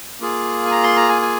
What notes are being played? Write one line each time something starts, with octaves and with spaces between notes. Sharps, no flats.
A#3 F4 G#4
G#5
A#5
C6
A#5
G#5
G#5